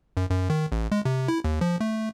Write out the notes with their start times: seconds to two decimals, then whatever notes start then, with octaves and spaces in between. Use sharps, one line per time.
0.17 F#2
0.30 F#2
0.50 D#3
0.72 A1
0.92 G#3
1.05 C3
1.28 E4
1.44 D#2
1.61 F3
1.81 A3